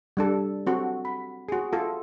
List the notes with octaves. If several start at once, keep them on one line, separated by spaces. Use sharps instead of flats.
G3 D4 A4
C4 F#4 A4
B5
F#4 G#4
F4 A4